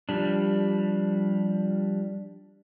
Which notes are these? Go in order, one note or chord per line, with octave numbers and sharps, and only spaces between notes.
F3 G3 D4